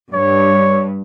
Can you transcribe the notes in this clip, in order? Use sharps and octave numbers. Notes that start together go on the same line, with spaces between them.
G2 C#5